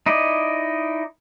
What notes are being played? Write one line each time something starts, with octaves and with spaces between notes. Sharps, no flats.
D#4 E4 D5 D#5